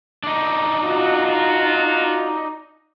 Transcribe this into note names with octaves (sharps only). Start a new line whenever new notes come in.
D4 D#4
F4 F#4